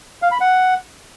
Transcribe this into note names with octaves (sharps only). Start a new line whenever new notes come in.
F5
B5
F#5